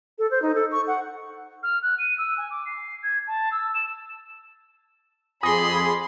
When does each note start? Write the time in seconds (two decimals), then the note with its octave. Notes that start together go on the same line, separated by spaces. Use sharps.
0.19 A4
0.31 C5
0.42 D#4
0.55 A4
0.72 C#6
0.87 F#5
1.63 F6
1.82 F#6
1.98 D#7
2.18 E6
2.37 G#5
2.50 D6
2.66 C7
3.03 G#6
3.27 A5
3.51 E6
3.74 E7
5.43 F2 G#4 D5 G#5 B5 C6 D#6 A#6